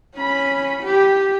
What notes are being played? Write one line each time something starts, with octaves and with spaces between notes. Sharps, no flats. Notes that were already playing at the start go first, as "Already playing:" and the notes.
C#4 B5
G4